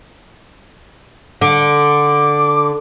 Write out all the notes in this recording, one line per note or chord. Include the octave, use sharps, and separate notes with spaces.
D3 D6